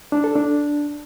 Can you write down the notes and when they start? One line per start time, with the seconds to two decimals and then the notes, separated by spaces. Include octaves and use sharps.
0.12 D4
0.24 A4
0.35 D4